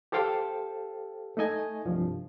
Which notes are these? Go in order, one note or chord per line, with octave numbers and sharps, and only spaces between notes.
G4 A4 C5 F5 G5 A5
A3 D#4 D#5 G#5
C2 G2 F3